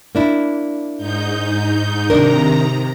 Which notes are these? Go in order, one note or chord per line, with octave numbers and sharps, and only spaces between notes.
A#3 D4 E4
G#2 D#4 G6
C3 D#3 D4 A#4 A#5